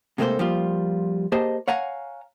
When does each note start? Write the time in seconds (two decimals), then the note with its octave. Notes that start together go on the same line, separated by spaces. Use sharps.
0.18 A2 C3 G#3 A#3 A4 C5
0.39 F3 G3 A#3 F4
1.32 A#3 G4 G#4 C5 D#5 A5
1.68 C#5 F5 F#5 G#5 A#5